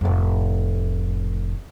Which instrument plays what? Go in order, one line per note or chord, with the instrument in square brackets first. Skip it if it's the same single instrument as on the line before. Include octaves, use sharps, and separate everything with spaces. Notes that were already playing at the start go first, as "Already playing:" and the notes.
[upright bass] F1 A2